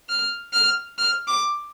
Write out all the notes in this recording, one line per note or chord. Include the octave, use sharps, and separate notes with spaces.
F6
F6
F6
D6